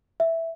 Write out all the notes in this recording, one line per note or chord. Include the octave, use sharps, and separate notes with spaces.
E5